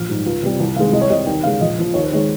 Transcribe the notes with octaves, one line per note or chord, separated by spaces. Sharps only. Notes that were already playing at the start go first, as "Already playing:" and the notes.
Already playing: A#1 F6
G#2 G3
C#2
C3 G3
C2
C3 D#3 G#3 F5
C2 D#5
C#5
C3 G3 D#5
D#2 G5
C#3 G#3 F5
A#1 D#5
A#2 F3
D#2 C#5
C5
D#3 G#3 C#5